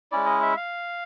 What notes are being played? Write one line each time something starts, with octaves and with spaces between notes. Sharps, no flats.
G#3 C#4 E4 D5
D#5
E5
F5